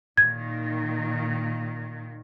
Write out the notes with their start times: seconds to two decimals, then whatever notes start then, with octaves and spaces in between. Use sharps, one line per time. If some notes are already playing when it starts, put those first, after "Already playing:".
0.17 A#2 D#3 G#6